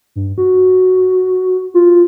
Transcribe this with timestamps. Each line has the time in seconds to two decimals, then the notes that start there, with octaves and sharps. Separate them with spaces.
0.16 G2
0.38 F#4
1.74 F4